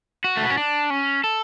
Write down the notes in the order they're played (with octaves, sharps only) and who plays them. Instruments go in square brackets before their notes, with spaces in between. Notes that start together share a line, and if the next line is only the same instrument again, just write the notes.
[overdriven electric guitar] F#4
A3
B3
C#4
D4
C#4
A4